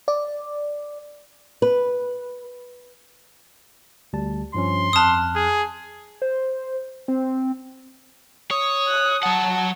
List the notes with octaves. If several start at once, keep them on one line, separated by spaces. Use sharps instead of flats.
D5
B4
D2 G3 A5
G2 F3 C#4 C6
F2 A5 D#6 F6 F#6
G#4
C5
C4
C#5 D#6
F#6
F#3 F#5 A5